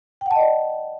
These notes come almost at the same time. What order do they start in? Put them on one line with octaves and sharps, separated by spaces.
G5 F#5 A5 D#5 D5